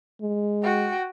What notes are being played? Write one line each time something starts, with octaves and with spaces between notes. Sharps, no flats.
G#3
F#4 G5